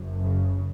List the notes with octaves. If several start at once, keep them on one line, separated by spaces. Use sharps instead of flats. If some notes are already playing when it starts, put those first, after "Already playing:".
Already playing: F#1 F#2
C#3